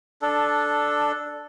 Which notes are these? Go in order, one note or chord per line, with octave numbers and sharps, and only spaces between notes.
D4 A4